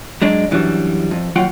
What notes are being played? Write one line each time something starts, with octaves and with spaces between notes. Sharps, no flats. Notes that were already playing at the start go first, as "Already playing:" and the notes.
F#3 G#3 D4
F#2 E3 G3 D4
F2
D#2 F#3 F4 F#5 G5